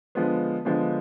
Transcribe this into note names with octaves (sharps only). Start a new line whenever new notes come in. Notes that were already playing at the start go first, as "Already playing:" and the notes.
D3 F3 G#3 B3
D3 F3 G#3 B3